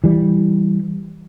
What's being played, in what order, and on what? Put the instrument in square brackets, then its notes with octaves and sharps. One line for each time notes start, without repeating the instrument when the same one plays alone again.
[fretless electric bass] E3 G3